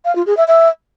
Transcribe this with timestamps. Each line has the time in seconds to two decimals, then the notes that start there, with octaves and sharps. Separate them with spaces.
0.05 F5
0.15 F4
0.26 G#4
0.37 E5
0.47 E5